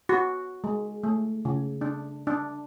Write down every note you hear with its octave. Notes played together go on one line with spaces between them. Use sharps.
F#4
G#3
A3
C#3
D4
D4